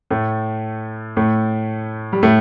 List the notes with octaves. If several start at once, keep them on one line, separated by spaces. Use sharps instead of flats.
A2 A3
A2 A3
G3
A2 A3